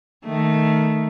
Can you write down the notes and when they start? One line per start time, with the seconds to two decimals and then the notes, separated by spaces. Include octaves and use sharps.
0.25 D#3 A3